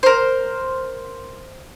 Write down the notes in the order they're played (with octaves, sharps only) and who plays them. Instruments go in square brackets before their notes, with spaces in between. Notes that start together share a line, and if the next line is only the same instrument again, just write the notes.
[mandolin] A#4 C5